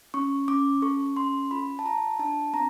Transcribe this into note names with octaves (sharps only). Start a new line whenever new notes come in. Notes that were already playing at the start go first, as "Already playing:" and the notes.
C#4 C#6
C#4 D6
A4 C#6
C#4 C6
F4 B5
A5
F4 A#5
D4 A5
C4 A#5